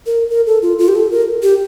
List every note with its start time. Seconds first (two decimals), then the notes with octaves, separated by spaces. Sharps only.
0.06 A#4
0.30 A#4
0.47 A4
0.62 F4
0.79 F4
0.88 G4
0.95 A4
1.11 A#4
1.43 G4